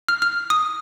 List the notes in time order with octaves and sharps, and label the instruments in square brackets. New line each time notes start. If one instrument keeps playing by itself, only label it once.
[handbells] F6
F6
D#6